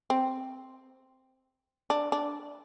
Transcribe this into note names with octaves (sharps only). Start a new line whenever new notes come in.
C4
D4
D4